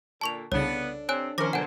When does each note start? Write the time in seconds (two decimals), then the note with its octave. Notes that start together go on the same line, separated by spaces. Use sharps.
0.21 A#2 D3 A5 C#6 F7
0.52 C2 C#3 B3 D4 A4 C#5
1.09 C3 C4 C#5 G#5 F#6
1.38 D#3 F3 C#4 A#4 C5 D6 A#6
1.53 B2 D3 F#3 A4 C5 F#5 G#5